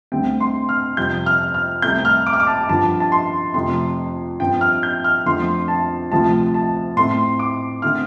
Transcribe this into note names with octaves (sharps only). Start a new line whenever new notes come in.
D2 D3 G3 C4 G5
C6
F6
F2 C3 G3 G6
F6
F6
C2 C3 A3 C4 G6
F6
D6
F6
D6
A5
G2 D3 F3 A5
A5
C6
F2 C3 A3 C4 C6
G2 F3 C4 G5
F6
G6
F6
F2 D3 A3 C4 C6
A5
D2 C3 F3 C4 A5
A5
A2 A3 C4 C6
D6
D3 A3 C4 F6